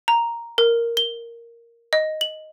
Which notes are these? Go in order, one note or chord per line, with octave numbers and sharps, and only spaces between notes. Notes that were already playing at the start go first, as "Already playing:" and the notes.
A#5
A#4
G7
D#5
F#7